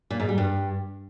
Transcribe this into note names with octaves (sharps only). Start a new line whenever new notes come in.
A#2
G#2
G3
G2